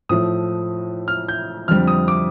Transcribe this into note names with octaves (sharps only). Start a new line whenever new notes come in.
A2 F3 A3 D#6
F6
G6
F2 D3 G3 C4 F6
D#6
D6